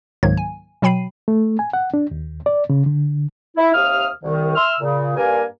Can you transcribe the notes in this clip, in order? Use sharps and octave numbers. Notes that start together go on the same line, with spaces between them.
C#2 G#2 D#3 F#3 A#3 G#6
G#5
B2 F#3 G5 B5 C7 D#7
A3
G#5
F#5
D4
D#2
D5
C#3
D3
E4
D#2 C3 F5 D#6 F6
C2 D#3
E5 C6 E6 F6
A#2 C#3
G2 A#3 A#4 G#5